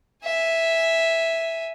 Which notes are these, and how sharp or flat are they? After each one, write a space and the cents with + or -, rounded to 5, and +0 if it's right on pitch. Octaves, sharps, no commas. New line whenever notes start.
E5 +0 G#5 +0